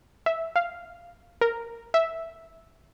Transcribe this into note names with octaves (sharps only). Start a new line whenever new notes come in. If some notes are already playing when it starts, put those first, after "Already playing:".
E5
F5
A#4
E5